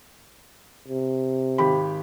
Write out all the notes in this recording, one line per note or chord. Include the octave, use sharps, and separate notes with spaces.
C3
G#1 G4 B5